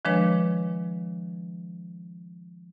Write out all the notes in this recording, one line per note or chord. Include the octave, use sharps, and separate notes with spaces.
D#3 F3 G#3 D4 B4 C#5